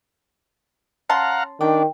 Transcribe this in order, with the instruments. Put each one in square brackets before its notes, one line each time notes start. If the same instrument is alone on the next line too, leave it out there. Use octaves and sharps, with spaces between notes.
[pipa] C#4 A5 C6 [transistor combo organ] F5 F#5 A#5
[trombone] D#3 [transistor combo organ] D4 [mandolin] G5